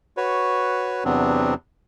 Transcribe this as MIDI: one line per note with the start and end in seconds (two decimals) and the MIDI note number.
0.17 1.04 66
0.17 1.04 71
0.17 1.04 73
1.05 1.54 40
1.05 1.54 48
1.05 1.54 54
1.05 1.54 59
1.05 1.54 60
1.05 1.54 62